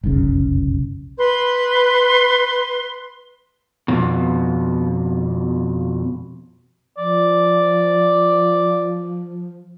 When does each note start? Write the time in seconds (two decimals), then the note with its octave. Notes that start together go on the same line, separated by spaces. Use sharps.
0.03 F1 B1 F#2 C#3
1.18 B4 C6
3.88 F2 B2
6.98 F3 D5